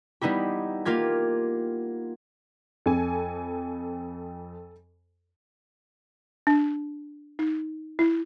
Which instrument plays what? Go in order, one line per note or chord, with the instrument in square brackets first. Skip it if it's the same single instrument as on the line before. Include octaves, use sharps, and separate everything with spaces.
[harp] G3 B3 D#4 E4 G4
A#3 F4 G4 G#6
[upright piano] F2 [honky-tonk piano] A4 G#5
[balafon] D4
D#4
E4